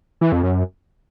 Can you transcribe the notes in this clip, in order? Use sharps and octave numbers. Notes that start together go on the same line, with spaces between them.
E3
F2
F#2